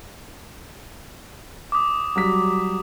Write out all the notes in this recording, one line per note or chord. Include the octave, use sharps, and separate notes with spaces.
D6 D#6
F#3 G3 B6